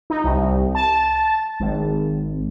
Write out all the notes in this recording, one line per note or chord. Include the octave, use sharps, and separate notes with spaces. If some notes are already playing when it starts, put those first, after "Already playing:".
D#4
C2
A5
G#1